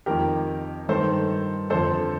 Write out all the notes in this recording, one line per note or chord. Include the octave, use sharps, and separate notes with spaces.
F2 D#3 G4 A#4
G2 D#3 A4 C5
F2 D3 A4 C5